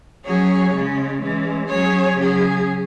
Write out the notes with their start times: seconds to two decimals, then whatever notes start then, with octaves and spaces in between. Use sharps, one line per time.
0.25 F#3 C#4 G#4 C#5
0.73 C#3 G#3 C#4
1.20 E3 G#3 C#4
1.68 F#3 C#4 G#4 C#5
2.16 C#3 F#3 C#4 G#4